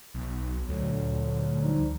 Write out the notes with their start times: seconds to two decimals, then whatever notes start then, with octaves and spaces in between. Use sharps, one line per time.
0.14 B1
0.69 D2 A#2 D3 F#3
1.62 F3 G3 D#4